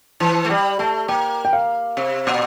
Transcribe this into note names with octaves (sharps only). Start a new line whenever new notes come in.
E3 A5
A3
G3 G5
A3 A5
A#3 G5
G5
F5
C3
A#2